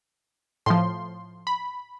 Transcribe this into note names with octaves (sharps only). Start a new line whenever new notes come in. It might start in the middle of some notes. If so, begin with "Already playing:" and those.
A2 F3 C6
B5